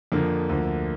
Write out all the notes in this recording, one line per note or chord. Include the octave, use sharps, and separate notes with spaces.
F2 D3 F3 A#3
D2 D3 F3